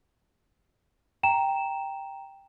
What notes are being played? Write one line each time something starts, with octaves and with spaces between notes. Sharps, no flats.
G5 A#5 E7